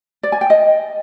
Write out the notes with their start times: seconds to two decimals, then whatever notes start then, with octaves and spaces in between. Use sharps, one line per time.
0.23 D5
0.32 G#5
0.41 G5
0.50 D#5